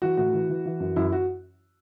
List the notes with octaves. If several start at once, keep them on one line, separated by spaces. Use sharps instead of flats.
E3 F#4
A2 F#4
E3
E3
E3
F#2
F#2 E4
F#4